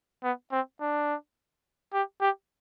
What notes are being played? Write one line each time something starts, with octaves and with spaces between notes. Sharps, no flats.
B3
C4
D4
G4
G4